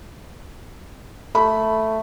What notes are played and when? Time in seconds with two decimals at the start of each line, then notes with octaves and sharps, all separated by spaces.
1.35 A3 B5